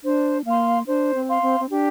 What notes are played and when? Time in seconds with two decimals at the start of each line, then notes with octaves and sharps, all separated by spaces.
0.04 D4 C5
0.45 A#3 F5 C6
0.87 D4 C5
1.15 C4
1.29 F5 C6
1.42 C4
1.60 C4
1.69 D4 G4